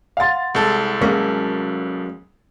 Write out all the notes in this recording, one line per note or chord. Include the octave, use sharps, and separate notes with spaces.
F5 F#5 C6 A6
C2 G#3 A4
F#3 G#3 A#3 C#4 B6